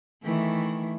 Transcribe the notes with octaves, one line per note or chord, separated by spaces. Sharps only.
D#3 E3 A3